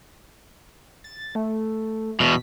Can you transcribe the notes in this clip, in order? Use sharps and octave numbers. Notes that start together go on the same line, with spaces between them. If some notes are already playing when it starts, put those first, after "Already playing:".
A6
A3
E2 B2 B6